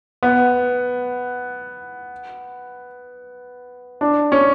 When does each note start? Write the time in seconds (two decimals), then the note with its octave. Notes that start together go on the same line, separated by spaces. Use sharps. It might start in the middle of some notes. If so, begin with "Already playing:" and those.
0.23 B3
4.01 D4
4.32 C#4